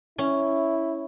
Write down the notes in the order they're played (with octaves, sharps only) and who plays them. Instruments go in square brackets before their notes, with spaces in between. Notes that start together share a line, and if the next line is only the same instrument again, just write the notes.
[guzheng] C#4 [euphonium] E4